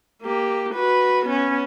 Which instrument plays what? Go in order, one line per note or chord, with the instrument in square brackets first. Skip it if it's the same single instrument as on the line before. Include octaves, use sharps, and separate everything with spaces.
[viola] A#3 G4
F#4 B4
B3 C#4